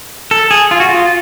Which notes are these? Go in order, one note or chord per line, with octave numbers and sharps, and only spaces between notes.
A4
G#4
F4
F#4
F4